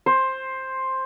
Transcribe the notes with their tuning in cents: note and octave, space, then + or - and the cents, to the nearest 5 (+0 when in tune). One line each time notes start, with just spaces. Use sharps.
C5 +10